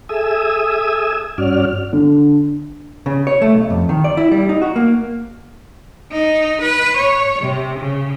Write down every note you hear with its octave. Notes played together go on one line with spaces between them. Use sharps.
G#4 A4 E5 G#5 D#6 E6
G2 C#4 F#4 D5 F6
D3
C#3
C#5
A3
B1
F2
D#3
D5
E4
G3
D#4
F#4
A#3
D#4
B4
C#5
C3
C#3